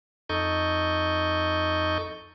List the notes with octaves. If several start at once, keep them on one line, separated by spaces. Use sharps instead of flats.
F2 D#4 A4 D#5 C#6 G6